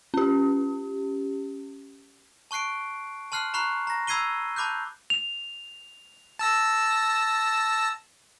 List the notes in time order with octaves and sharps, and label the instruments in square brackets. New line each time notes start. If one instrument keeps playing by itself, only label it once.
[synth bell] C#4 G4
[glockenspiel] A5 C#6 F#6 C7 D7
A5 C6 F6 F#6 C7
A#5 B5 C#6 F#6 C7
A#5 A#6
B5 E6 G#6 C7 D#7 G7
A5 B5 D6 F#6 G6
F7
[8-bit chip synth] A5 E6 A#6